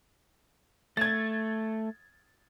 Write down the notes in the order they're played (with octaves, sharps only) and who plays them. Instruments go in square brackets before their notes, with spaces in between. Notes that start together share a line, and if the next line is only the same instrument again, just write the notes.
[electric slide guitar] A3 [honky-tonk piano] G#6 A6